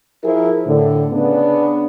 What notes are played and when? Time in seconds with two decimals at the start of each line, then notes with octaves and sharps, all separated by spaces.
0.23 F3 E4 G#4 A#4
0.66 A2 D3
1.13 C#3 B3 D4